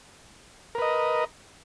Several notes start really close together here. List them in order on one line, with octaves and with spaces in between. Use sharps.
A#4 B4 D#5